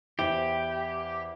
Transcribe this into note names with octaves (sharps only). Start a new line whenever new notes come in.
E2 E4 G4 C5